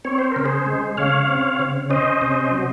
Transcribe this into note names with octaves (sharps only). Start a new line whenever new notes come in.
C4 C#5
C5
C#3 A#4
G#4 C5
G#3
C#3 C#5 F5
C4
C#3
C#4 C5 D#5
C3
F#3